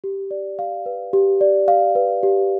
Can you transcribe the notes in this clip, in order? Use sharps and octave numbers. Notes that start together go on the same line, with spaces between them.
G4
D5
F5
B4
G4
D5
F5
B4
G4